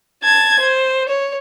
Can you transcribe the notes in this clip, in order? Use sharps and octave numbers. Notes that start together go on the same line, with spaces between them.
A5 G#6
C5
C#5